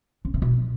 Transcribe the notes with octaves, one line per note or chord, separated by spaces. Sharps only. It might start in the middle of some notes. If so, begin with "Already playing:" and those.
C#3
C3
B2